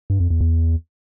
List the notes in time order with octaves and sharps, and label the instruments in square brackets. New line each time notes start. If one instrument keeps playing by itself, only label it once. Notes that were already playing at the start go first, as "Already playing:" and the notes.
[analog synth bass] G2
F2
E2
E2